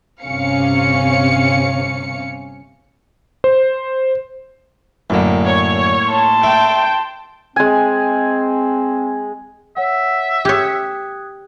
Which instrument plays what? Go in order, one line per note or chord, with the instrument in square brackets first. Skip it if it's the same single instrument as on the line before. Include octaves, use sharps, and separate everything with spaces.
[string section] G1 C3 C#4 F5 C#7
[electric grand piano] C5
[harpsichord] F#2 D3 [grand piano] A2 A#3
[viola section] C#5
[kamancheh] A5 C6
[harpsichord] A3 [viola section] G5
[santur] G#3 G#5 [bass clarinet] C4
[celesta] C#5 F#5 [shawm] E5
[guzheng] G4 C#5 [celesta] D#6 F#6 G#6